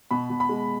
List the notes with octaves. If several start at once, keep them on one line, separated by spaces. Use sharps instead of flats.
B2 B5
B2
B5
G#3